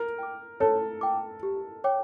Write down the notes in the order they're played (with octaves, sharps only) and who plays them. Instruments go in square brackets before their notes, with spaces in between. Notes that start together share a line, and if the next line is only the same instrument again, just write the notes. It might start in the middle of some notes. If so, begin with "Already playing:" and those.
Already playing: [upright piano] A#4
[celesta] G5 D6
[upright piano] A4 [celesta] C#5
[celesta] G5 D6
G4
C#5 G5 D6